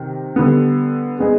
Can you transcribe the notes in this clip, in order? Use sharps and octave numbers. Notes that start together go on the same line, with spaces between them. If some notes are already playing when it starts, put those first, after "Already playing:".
Already playing: C3 D#3
D3 G3 B3
G#3 B3 D#4 G#4